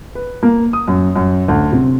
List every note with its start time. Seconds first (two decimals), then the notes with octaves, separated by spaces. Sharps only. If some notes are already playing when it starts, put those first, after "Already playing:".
0.15 B4
0.43 A#3
0.73 D#6
0.88 F#2
1.16 F#2
1.48 D2
1.72 C3